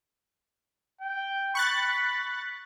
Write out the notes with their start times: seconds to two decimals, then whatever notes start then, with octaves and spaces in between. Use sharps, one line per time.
1.01 G5
1.55 B5 C#6 F#6 A6